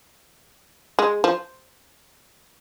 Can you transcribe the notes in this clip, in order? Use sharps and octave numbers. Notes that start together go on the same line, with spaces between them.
G#3
F3